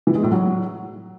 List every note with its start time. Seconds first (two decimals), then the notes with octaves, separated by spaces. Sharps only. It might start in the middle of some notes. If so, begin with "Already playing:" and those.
0.07 E3
0.15 G#3
0.23 A2
0.32 F#3